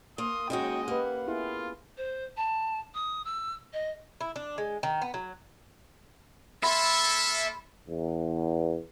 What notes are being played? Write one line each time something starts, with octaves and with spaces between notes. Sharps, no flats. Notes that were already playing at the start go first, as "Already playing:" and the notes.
A#3 C6 D#6
D#2 G#3 A#3 C#4 D#4 F#4 D#5 G5
A#3 G4 B4 F#5
B3 E4 F4 G#4
C5
A5
D#6
E6
D#5
E4
D4
G#3
D#3
B3
F#3
A#3 A4 E5 B5 C6
E2